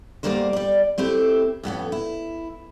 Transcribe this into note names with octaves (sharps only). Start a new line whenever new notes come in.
E2 G2 G3 A#3 A#4 C5
G3 D5
A3 C4 E4 G4
F2 A2 B3 C#4
E4